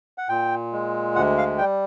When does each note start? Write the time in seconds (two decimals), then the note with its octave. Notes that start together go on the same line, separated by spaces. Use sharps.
0.18 F#5
0.29 A#2 G5
0.73 G#3
1.15 D2 F#5
1.38 F5
1.58 G3 G5